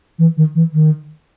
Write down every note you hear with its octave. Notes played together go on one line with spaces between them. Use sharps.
E3
D#3
E3
D#3